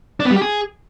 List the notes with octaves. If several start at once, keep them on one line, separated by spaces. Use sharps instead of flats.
D4
B3
G3
G4
G#4